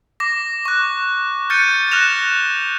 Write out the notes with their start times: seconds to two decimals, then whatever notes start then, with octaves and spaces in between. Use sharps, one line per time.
0.20 D6 A#6
0.65 C#6 F#6
1.50 F6 G6 A6 C#7 D#7
1.92 F6 F#6 A#6 E7 F7